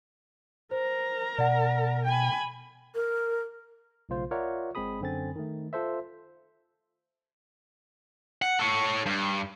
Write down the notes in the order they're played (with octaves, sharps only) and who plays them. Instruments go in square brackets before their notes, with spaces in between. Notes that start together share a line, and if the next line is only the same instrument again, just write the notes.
[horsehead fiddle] A#4 A#5 [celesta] C5
[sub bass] B2 [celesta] D5 F#5
[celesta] G5 [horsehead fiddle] G#5 B5
[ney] A#4
[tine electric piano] B1 C#3 A3 F4 C5
F4 A#4 C#5 D5 E5 F#5
G1 G#3 C4 G#4 B5 D#6
F#2 D3 C4 G#5 A6
D#3 A3
F4 A4 C5 E5
[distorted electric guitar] F#5
A4 C#5
G2